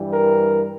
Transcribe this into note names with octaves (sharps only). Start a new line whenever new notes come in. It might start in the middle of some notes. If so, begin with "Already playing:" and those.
Already playing: G2 E3 G3
A#4